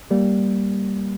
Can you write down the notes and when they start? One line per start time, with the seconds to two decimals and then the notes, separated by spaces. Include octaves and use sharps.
0.11 G3 A#3